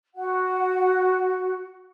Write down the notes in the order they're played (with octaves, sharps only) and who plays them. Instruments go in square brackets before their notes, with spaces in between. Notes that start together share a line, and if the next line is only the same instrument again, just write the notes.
[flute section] F#4 F#5